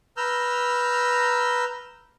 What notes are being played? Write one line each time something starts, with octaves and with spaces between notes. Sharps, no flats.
B4 A#5 E6 F6 G6